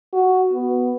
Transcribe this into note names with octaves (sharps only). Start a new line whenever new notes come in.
F#4
B3